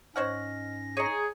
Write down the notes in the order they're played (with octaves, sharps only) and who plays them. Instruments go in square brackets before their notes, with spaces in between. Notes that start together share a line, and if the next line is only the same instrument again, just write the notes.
[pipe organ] G#2 C#4 A#6 [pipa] C5 C#5 F#5 [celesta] D#5 F6
[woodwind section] G#4 [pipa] C#5 D#5 [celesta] A#5 C#7 D#7